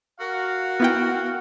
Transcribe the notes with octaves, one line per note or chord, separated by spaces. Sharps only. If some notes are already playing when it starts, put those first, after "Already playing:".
F#4 A#4 F5
B3 E4 G5